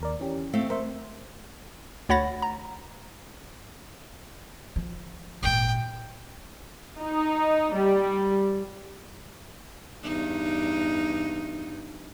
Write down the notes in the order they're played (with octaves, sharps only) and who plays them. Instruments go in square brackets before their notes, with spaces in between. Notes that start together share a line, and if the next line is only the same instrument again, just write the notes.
[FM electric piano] D#2 A#4 D5
E3 C#4 G4
[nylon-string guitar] A3 C4 F5
[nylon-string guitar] A3 [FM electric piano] A#4 C5 E5
[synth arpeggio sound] D2 C#5 F#5 B5 A6 A#6
A#5
[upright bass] F3
[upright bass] G#1 A#2 [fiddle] G5
[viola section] D#4
G3
[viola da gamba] E2 G2 D#4